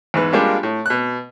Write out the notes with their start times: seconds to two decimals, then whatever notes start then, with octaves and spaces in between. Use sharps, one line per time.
0.14 E2 G#2 B4
0.33 G3 G#3 A#3 D4 F4 G4
0.63 A2
0.86 B2 F#6